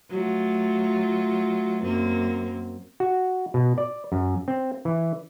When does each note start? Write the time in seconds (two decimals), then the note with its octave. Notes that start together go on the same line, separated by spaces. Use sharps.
0.10 F#3 A3 F4
1.83 F#2 A#3 C4
3.00 F#4
3.54 B2
3.78 D5
4.12 F#2
4.48 C4
4.85 E3